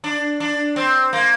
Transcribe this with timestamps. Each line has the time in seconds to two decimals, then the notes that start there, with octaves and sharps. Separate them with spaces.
0.04 D4
0.40 D4
0.76 C4
1.13 A#3